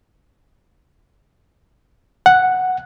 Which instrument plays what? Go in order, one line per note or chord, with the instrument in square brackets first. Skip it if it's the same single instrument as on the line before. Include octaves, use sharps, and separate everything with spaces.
[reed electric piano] F#5